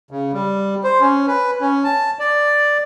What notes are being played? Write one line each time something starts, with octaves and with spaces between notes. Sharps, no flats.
C#3
G3
C5
C#4
B4
C#4
A5
D5